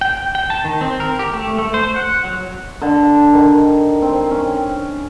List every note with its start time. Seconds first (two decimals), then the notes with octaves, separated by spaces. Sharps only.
0.01 G5
0.35 G5
0.50 A5
0.65 D#3
0.81 C4
1.00 A#4
1.19 G4
1.34 A3
1.58 A3
1.74 C5
1.96 F#5
2.25 F#3
2.82 D3
3.33 D#3
4.02 C4
4.31 C#4